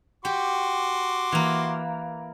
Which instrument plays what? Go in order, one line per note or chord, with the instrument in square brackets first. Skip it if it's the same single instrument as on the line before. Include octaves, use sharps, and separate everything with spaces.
[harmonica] F#4 C6 D6 [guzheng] G4
[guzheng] E3 A#3